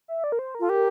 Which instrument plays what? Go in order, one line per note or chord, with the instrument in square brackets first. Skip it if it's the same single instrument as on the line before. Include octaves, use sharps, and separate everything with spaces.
[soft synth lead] E5
D5
A#4
C5
A#4
[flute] F4 [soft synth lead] A4
[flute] G4 [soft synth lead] A#4